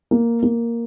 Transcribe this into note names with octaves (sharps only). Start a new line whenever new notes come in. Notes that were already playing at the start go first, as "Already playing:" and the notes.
A#3
A#3